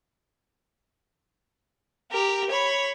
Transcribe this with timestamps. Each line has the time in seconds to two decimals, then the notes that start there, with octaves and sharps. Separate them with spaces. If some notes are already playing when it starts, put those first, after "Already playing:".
2.12 G4 A#4
2.50 C#5 B5